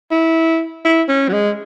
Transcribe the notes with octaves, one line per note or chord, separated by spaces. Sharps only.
E4
E4
C#4
F#3
G#3